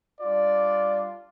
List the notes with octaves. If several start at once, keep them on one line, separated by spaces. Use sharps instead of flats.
G3 D4 F4 D5